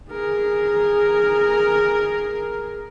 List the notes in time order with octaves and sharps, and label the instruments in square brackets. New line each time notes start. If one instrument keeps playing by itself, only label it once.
[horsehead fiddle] G#4 A#4